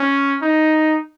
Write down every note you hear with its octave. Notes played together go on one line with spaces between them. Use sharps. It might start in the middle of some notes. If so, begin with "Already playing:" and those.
Already playing: C#4
D#4